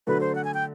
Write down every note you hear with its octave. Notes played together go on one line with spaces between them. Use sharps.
D3 F#3 A3 B4
C5
F#5
G#5
G5